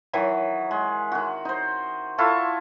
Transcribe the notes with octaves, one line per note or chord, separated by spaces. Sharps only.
D#3 E3 F#3
G#3
D#3 F#4
D#4 C5
E4 F4 A4 C#6